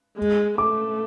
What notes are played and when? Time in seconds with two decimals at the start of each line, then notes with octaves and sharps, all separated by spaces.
0.17 G#3
0.58 A3 D6